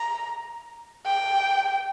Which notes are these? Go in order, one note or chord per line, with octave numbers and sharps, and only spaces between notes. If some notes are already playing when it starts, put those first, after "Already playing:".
Already playing: A#5
G5